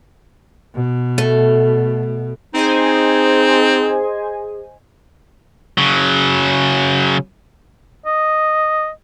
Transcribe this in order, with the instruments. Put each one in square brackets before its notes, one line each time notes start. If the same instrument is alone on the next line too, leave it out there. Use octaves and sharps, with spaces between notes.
[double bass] B2
[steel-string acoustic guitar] A3
[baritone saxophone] C4 [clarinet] D#4 [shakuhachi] G#4 [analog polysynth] C5 D#5 G#5
[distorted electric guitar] C#3 F#3
[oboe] D#5